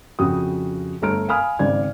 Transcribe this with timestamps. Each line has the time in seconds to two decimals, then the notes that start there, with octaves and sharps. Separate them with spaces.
0.19 F2 C#3 F#4 G5 D#6
1.02 G1 A3 A#5 F6 D7
1.28 F5 G#5 B5 D#6 F6
1.59 G#1 C#3 D5 G#6